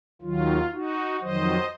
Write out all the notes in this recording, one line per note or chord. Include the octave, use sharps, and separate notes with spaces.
D#2 D#3 F#3 F4
D#4 F#4
F2 D#3 F#3 C5 D#5